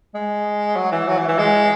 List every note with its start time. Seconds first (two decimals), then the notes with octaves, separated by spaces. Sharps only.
0.15 G#3
0.77 F#3
0.92 E3
1.08 F#3
1.18 E3
1.28 E3
1.39 G#3